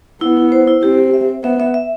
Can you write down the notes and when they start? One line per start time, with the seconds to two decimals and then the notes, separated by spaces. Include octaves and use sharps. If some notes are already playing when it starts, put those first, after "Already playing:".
0.21 B3 E4
0.37 E4
0.52 C5
0.67 E4
0.83 C4 G4
0.98 G4
1.14 E5
1.28 C5
1.43 B3 E5
1.60 E5
1.74 E5